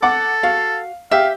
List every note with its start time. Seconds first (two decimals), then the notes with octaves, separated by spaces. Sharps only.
0.02 A4 F#5 D6
0.43 F#4 F5
1.11 G4 E5 F5 G5